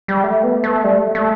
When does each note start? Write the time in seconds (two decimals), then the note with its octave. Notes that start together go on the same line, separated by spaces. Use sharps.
0.08 G3
0.24 A3
0.43 B3
0.64 A3
0.84 G3
0.99 A3
1.15 A3